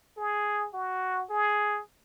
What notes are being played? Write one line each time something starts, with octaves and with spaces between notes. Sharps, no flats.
G#4
F#4
G#4